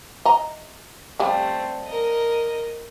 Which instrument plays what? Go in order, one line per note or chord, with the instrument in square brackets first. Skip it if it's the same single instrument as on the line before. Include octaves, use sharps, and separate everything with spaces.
[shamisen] D#5 A#5
[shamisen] F3 G3 [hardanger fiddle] A3 C4
[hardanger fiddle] A#4 D#5